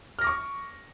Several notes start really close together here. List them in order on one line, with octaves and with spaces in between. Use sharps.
F6 A#6 D6 C#6